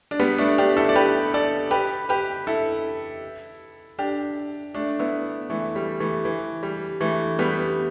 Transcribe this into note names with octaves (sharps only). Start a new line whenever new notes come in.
D4
G3 B3
A3 D4
D4 G4
E4 A4
D5
G4 B4
A4 D5
G4 B4
G4 B4
E4 A4
D4 G4
A3 D4
B3 E4
E3 A3
G3
E3 A3
E3
G3
E3 A3
G3 B3